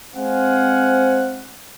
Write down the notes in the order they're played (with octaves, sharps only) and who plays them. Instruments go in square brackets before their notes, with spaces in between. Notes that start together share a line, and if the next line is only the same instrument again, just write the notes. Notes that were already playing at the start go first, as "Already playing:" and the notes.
[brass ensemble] G#3 C4 C5 F5 F#5 G#5